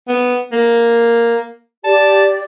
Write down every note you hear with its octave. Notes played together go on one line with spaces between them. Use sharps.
B3
A#3
G4 D5 A5